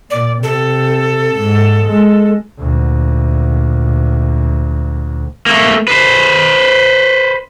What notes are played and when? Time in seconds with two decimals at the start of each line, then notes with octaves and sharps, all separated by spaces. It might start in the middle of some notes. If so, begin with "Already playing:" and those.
0.11 A#2 D5
0.43 C3 A4
1.36 G#2
1.85 G#3
2.58 D2 A#2
5.46 A3 A#3
5.88 B4 C5